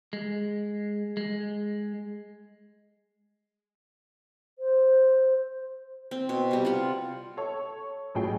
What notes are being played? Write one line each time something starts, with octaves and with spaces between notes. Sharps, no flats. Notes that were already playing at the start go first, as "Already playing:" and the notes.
G#3
G#3
C5
C4
B2
C3 G3
F4 F#5
A4 C#5
A1 A2 F#3 G#4 G5